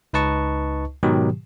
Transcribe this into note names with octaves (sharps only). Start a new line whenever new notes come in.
C#2 D#4 B4 D#5 A5 C#6
G#2 B2 D#3 F#3 G4